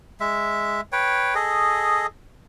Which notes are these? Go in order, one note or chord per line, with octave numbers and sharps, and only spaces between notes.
G#3 E5
B4 C#5 G5
G#4 A4 D#5